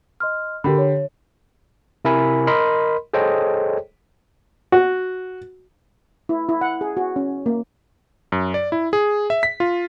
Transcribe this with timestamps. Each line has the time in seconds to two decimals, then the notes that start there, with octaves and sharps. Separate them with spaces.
0.20 D#5 C6 F6
0.64 D3 G4 A#4 B5
0.78 C#5
2.05 C3 E4 A#4 E5 G#5 B5
2.47 A#4 D#5 B5 C6
3.14 G#4 A4 C5 C#5 D#5 G5
4.72 F#4
6.29 E4
6.49 E4
6.61 F#5
6.81 G#4
6.97 F#4
7.16 C#4
7.46 A#3
8.32 F#2
8.54 D5
8.72 E4
8.93 G#4
9.30 E5
9.43 B6
9.60 F4